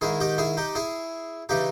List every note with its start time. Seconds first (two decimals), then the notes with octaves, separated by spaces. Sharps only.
0.01 G#2 D#3 E4 G#4
0.20 D#4 G4
0.38 E4 G#4
0.57 D#4 G4
0.75 E4 G#4
1.49 C#3 E3 D#4 G4